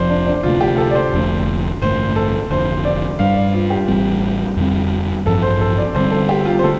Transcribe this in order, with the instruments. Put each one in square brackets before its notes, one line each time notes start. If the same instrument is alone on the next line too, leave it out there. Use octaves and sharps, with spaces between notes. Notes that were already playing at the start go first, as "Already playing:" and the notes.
Already playing: [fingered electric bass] F1 F2 F3 [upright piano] C5 D5
[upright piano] D4
D4
[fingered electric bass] D2 C3 A3 [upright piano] F4
[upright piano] G4
A4
D5
C5
[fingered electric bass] F1 F2 D3 A3
[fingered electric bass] A1 G2 D3 A3 [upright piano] C5
[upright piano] A4
[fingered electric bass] F1 F2 D3 [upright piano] C5
[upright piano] D5
[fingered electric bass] G2 G3 D4 [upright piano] F5
[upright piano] D5
F4
G4
[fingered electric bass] A1 A2 G3 C4
F2 D3 G3 C4
[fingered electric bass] A1 G2 F3 C4 [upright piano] A4
[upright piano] C5
A4
D5
[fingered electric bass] D2 D3 G3 C4 [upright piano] C5
[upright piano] A4
G4
F4
C5
[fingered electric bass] D3 A3 [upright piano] A4